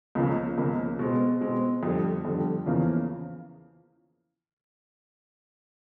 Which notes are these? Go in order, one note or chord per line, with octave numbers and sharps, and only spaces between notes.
C#2 C#3 F3 A#3
C#2 C#3 F3 A#3
B2 G#3 C4
B2 G#3 C4
F2 D3 G3
F2 D3 G3
E2 C#3 F3 A#3